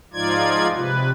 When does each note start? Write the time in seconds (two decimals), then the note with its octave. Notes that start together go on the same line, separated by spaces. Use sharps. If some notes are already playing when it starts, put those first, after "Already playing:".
0.13 G#2 F3 D#4 F4 D5 G#6
0.75 C3 B4